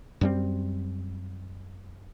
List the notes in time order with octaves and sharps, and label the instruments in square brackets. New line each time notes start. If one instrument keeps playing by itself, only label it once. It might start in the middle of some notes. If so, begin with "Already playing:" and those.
[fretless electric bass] F#2 G3 C4